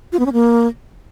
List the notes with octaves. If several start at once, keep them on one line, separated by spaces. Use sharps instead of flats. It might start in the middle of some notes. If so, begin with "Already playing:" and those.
F4
B3
C#4
A#3